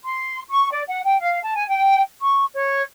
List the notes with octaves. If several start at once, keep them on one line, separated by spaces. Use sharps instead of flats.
C6
C#6
D5
F#5
G5
F5
A5
G#5
G5
C#6
C#5